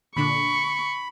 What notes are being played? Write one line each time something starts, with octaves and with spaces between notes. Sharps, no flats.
A#2 D3 D4 B5 C#6